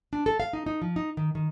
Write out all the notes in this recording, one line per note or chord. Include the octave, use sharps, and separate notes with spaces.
D4
A4
F5
D#4
D#4
F3
D#4
D#3
D#3